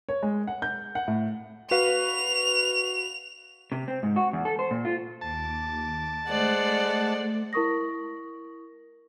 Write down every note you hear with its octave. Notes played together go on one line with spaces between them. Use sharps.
C#5
G#3
F#5
G6
F#5
A2
F#4 B4 F5 F7
C3
C4
G#2
F#4
E2
A4
C5
A#2
F4
D#2 A5 D6
G#3 A3 C5 D5 F#5
E4 A#4 C#6 D#6 A#6